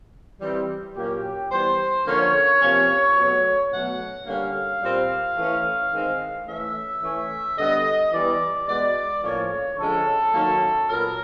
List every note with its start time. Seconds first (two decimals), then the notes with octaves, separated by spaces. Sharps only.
0.41 E3 G3 C4
0.96 A#2 F#3 A#3 C#4 G4
1.50 E3 G3 B3 C5
2.06 D3 F3 A#3 C#4 C#5
2.61 C3 F3 A#3 C#4
3.17 B2 F#3 A3
3.71 B2 F#3 A3 C#4 F#5
4.26 D3 G3 A#3 C#4 F5
4.82 A#2 G3 C4
5.37 E3 A3 C#4
5.92 D#3 G#3 C4
6.47 E3 A3 C#4 E5
7.02 E3 A3 C#4
7.57 D3 G3 B3 D#5
8.12 E3 G3 B3 D5
8.67 B2 G#3 B3 D5
9.22 A2 F3 A#3 C#4 C#5
9.77 D3 F3 G#3 C#4 A4
10.32 D#3 F#3 A#3 C#4
10.87 A#2 F#3 B3 A#4